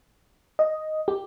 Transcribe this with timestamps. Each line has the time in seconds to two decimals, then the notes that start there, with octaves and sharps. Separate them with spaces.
0.59 D#5
1.08 G4